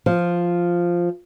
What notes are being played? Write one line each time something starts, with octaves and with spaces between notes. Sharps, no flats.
F3